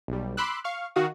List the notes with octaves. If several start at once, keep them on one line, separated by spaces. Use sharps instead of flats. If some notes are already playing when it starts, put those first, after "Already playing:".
B1 G3
B5 C6 D6 E6 F#6
F5 C#6 F6
D#3 F#4 F5 D#6